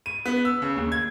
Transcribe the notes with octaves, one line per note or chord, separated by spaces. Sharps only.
D#7
B3
E6
C#3
D#2
G#6